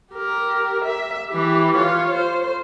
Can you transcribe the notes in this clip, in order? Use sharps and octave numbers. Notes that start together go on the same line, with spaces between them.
G4 A#4
E5
E3 G4
F4 C#5
C5